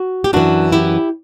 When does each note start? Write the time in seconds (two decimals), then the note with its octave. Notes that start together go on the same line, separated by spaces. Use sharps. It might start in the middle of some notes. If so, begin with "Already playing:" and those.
Already playing: F#4
0.24 G4
0.33 F#2 E3 D4 F#4
0.72 E4 G4